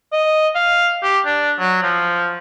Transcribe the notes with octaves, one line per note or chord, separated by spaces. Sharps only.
D#5
F5
G4
D4
F#3
F3